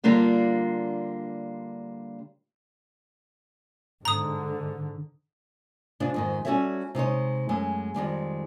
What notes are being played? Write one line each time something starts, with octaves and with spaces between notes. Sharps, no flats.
D3 G3 A#3 D4 F4 D5
G#2 D3 A#5 D#6
G#2 C3 G#3 C4 D4 F4
F2 G#2 D#3
G3 C#4 F#4 A4 C#5 E5
C3 G#3 D#4 C#5
F#2 G#3 A3
F2 D#3 G3 G#3